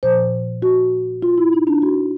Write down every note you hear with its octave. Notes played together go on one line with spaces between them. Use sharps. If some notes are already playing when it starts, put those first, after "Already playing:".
A#2 F3 C5
F#4
F4
E4
D#4
D4
F#4